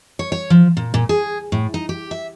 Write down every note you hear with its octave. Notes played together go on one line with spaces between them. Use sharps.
C#5
C#5
F3
A#2
A#2
G#4
A2
D#4
G4
E5